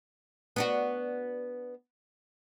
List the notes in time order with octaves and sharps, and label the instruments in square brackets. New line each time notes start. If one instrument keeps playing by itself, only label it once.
[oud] B3 D4 F#4